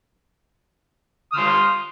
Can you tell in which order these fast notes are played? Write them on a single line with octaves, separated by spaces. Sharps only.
D#6 F6 C6